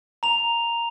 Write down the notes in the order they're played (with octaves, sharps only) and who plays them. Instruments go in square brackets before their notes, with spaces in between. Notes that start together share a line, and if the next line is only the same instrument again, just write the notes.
[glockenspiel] A#5 F7